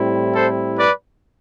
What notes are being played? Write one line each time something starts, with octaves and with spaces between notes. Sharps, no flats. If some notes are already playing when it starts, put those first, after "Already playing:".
Already playing: A2 G3 C4 E4
A4 C5
B4 D5